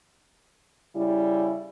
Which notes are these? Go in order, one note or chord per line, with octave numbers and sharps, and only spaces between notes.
C#3 G3 E4